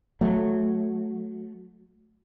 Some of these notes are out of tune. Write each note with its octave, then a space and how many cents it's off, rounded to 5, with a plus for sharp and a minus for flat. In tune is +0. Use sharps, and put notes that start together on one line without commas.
F#3 -15 A3 -10